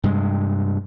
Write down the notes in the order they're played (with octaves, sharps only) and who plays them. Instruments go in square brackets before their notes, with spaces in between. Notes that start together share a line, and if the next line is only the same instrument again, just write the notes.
[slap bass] G2 C3 G#3